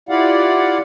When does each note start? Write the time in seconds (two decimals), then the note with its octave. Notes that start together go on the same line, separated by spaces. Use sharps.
0.09 E4 F4 G4 D5 F5 F#5